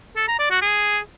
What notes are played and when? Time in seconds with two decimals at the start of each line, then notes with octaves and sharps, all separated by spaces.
0.17 A4
0.28 A#5
0.39 D5
0.51 F#4
0.62 G#4